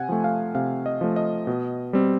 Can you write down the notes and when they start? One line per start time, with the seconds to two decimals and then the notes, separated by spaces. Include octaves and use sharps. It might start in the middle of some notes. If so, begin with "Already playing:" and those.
Already playing: C3 F#5 G#5
0.09 F3 A3
0.24 F5
0.55 C3 F5
0.86 D#5
1.01 F3 A3
1.16 D#5
1.47 B2
1.93 G3 C4